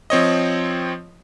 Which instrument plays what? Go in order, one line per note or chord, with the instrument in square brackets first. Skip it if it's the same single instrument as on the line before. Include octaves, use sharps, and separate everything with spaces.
[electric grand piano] F3 C4 C#5 D#5